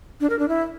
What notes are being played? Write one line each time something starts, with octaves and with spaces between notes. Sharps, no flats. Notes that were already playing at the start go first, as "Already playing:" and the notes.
D4
A#4
D4
E4